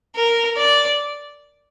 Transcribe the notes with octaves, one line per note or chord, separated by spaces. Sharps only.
A#4
D5